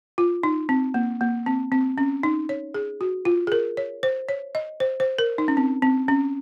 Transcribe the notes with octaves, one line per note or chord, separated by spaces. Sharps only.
F4
D#4
C4
A#3
A#3
C4
C4
C#4
D#4
C#5
G#4
F#4
F4
G#4
A#4
C#5
C5
C#5
D#5
C5
C5
A#4
D#4
C#4
C4
C4
C#4